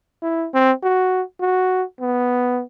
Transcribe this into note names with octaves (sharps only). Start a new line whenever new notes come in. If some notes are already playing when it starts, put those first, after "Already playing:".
E4
C4
F#4
F#4
B3